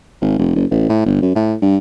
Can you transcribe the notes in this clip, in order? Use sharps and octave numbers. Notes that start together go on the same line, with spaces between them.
G#1
F1
F#1
A1
A2
G1
F#2
A2
G2